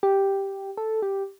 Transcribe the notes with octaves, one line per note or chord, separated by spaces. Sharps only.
G4
A4
G4